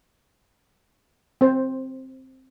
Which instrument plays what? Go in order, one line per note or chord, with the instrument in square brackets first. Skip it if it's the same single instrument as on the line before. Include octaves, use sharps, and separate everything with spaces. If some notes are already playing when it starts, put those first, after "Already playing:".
[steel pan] C4 C5